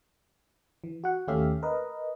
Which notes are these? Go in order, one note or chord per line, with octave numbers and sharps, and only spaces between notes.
E3
F#4 F#5
D#2 A3 C#4 G4 E5 F5
A#4 B4 D#5